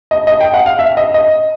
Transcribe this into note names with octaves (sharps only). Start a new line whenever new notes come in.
D#5
D#5
G5
F#5
F5
E5
D#5
D#5